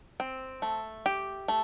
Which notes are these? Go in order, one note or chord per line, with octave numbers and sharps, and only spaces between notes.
C4
A3
G4
A3